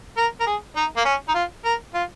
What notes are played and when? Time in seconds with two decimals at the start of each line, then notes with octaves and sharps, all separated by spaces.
0.17 A#4
0.40 A#4
0.47 G#4
0.76 D#4
0.97 A#3
1.05 C#4
1.28 D#4
1.34 F4
1.65 A#4
1.94 F4